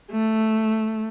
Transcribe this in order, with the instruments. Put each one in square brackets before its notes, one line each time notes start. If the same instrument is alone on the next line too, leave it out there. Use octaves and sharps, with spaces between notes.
[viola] A3